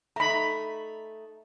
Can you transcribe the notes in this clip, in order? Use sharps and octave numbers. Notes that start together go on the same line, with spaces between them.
A3 D#4 A#5 B5